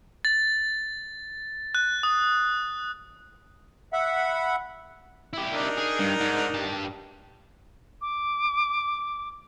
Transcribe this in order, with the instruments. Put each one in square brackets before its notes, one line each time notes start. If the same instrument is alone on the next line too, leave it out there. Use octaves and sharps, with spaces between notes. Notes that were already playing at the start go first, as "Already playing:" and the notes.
[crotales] A6
F#6
D#6
[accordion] E5 F#5 B5
[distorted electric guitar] E4 G4
[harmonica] D4 D#4 A#4
[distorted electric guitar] G#4
G2
G#2
G2 A5
[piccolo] D6